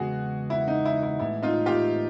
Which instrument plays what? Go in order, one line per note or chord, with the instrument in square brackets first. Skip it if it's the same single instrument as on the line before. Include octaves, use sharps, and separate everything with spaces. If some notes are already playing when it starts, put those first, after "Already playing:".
Already playing: [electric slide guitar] E2 C#3 G#3 B3 [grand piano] F#4 G#4
[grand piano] E4
D#4
E4
E4
[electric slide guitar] A2 E3 G#3 B3 [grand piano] E4
[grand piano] D#4 F4
F4 G4